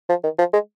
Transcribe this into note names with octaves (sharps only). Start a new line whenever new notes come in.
F3
D#3
F3
G#3